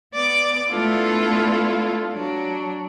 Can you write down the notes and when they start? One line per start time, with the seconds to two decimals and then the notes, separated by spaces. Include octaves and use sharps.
0.14 B3 D5 D6
0.70 A3 B3 D4 E4 F4 A4
2.13 F#3 D4